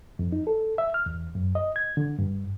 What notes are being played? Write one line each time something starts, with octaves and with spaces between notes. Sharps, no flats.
F2
D#4
A4
E5
F6
E2
F#2
D#5
G#6
D3
G2